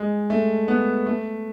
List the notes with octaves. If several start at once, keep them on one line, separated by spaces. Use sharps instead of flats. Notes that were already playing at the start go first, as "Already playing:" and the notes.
Already playing: G#3
A3
B3
A3